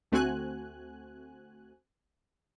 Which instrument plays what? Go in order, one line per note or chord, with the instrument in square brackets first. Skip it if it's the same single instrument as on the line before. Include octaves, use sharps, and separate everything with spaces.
[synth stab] D2 A3 C4 F#4 G#5 F#6